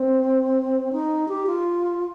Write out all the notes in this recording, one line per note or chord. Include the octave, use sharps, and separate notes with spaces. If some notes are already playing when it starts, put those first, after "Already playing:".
Already playing: C4
D#4
G4
F4